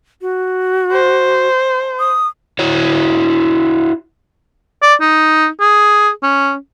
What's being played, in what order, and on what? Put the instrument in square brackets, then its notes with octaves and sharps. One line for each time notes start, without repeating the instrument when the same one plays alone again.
[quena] F#4
[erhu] C5
[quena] D#6
[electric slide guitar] E4 F#4 C#5
[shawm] D5
D#4
G#4
C#4